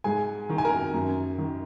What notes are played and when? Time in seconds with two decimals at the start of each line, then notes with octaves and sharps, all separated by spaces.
0.04 G#2 G#4 G#5
0.49 D#3
0.58 G#5
0.64 A#4 A#5
0.94 F#2
1.38 D#3